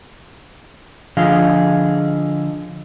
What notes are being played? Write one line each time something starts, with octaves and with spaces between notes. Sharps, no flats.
D3 F3 G#4 D#5 F5